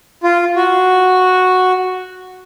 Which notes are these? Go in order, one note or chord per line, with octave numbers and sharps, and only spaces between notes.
F4
F#4